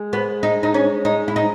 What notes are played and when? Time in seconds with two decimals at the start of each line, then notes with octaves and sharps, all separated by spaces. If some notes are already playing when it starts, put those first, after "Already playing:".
Already playing: G#3
0.13 B3
0.43 D#4
0.63 D#4
0.74 C#4
1.05 D#4
1.28 E4
1.36 D#4